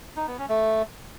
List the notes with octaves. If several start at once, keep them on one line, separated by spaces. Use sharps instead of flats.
D#4
B3
C#4
A3